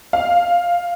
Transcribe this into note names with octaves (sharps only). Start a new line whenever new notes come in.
F5